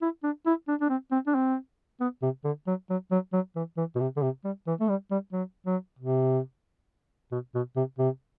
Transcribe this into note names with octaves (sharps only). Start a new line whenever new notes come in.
E4
D4
E4
D4
D4
C4
C4
D4
C4
B3
C3
D3
F#3
F#3
F#3
F#3
E3
E3
B2
C3
D3
C3
G3
E3
A3
G3
G3
F#3
F#3
C3
B2
B2
C3
C3